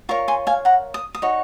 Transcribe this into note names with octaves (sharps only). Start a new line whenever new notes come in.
F4 A#4 C#5 A#5 C#6
G#5 C6
F5 G#5
F#5 A#5
D#6
D#6
D#4 F#4 C#5